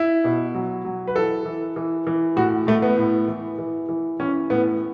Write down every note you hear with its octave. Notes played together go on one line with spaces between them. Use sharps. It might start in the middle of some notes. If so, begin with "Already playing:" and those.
Already playing: E4
B2
F#3
F#3
B4
E3 A4
E3
E3
E3
A2 F#4
A2 A3
B3
A2
E3
E3
E3
E3 C#4
A2 B3